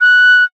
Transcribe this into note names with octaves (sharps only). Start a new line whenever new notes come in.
F#6